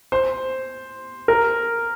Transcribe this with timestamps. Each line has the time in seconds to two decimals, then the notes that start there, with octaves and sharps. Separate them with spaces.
0.12 C5
1.28 A#4